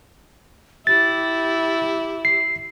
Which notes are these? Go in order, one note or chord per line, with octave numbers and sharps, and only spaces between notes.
E4 G4 A6
C7